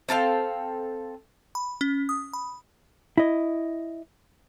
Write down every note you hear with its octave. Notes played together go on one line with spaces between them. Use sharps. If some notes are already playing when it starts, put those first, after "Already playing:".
C4 A4 F5 G5
B5
C#4
D#6
B5
E4 D#5